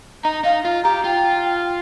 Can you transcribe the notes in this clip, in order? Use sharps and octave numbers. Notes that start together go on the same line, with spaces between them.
D#4 A#5
D#4 F5
F4 F5
G4 A#5
F4 G5